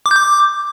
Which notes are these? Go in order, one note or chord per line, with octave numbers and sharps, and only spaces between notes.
D6
G6
D6